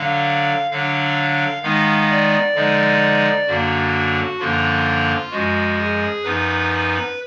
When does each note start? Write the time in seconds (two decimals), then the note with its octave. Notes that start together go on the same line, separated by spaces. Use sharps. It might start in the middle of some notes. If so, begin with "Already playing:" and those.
Already playing: D3 F#3 D4 F5
0.71 D3 F#3 D4 F5
1.63 D#3 G#3 B3 D#4 F5
2.09 D5
2.55 D3 F3 G#3 D#4
3.47 F#2 D3 F#3 A#3 D4 F#4
4.39 F#2 D3 F3 A#3 D4 F4
5.31 F#2 F3 G#3 F#4
5.77 G#4
6.23 F#2 F3 B3 D#4 B4